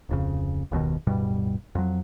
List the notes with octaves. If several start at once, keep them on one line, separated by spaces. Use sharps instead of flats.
D1 F2 C#3
F#1 D#2 B2 D#3
D1 G2 B2 G3
F2 F#3